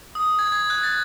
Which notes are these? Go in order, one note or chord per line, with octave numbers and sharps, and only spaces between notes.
D#6
G#6
G#6
F#6
A6